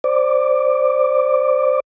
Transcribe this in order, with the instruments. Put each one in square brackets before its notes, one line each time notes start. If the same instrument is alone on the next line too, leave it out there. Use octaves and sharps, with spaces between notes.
[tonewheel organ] C5 D5 D6